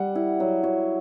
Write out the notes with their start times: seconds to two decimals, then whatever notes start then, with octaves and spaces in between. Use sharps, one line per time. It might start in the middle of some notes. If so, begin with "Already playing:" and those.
Already playing: G3 F#5
0.15 E4
0.40 F#3
0.63 F#3